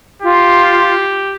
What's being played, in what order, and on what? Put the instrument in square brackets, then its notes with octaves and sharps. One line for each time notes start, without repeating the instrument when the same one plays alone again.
[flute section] F4 [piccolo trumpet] G4